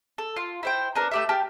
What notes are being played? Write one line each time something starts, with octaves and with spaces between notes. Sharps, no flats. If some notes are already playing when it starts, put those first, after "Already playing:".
A4
F4
E4 C5 G5
B3 D4 A#4
A3 G4 E5
G4 G5 A5 F6